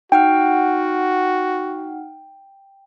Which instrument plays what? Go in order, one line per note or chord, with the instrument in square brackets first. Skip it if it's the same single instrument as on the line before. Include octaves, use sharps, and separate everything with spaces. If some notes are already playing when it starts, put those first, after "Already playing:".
[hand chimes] D#4 F#5 F6 [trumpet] F#4 [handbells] G5